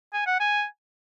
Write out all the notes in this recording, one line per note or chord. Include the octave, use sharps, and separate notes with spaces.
G#5
F#5
G#5